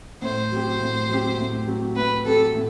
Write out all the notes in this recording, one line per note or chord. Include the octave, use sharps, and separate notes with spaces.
A2 C5
F#3 C4 G4
A2
F#3 C4 G4
A2
F#3 C4 G4
A2 B4
F#3 C4 G4 A4
A2